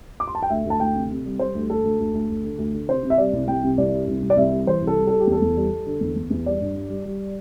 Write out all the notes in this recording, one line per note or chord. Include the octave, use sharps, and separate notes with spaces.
D6
C6
A5
G5
D2 E5
D2 A5
D2 G5
C3
C3
G3
G3 C5
D2
D2 A4
D2
D2
D2
D2
D3
D2
D3
C3 C5
C3
E5
G3 D5
C2
C2 G5
C3
C2 D5
G3
C2
C2
D5
C2 E5
G3
E3 C5
C2
A4
G3
G3 A4
G4
E2
A4
E2
G3
G3
D3
E2
E2
E2
G3 D5
G2
G3
G3
G3